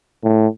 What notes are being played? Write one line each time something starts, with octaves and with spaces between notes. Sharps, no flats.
A2